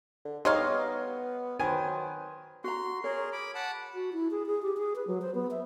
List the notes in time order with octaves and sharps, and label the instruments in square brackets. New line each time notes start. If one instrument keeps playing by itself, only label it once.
[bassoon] D3
[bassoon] G#2 [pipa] D#4 C#5 F5 [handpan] G4 D#5 [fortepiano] C6
[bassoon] B3
[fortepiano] D#3 G#5 [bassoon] F#3 [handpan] B4 C5
[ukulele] F#4 A#5 [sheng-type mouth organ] C6
[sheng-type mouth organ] G#4 A#4 [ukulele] C#5
[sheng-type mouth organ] B5 D6
F#5 A5 B5
[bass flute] F#4
E4
G#4
G#4
G4
G#4
B4
F#3
C5
B3
E5